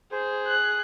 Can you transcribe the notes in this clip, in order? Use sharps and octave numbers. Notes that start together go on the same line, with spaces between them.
G#4 C5
F#6